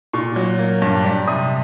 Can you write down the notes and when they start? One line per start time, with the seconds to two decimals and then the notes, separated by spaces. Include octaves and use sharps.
0.13 A#2 C#6
0.36 F#3
0.59 A#3
0.82 G2
1.04 G3
1.27 C3 D#6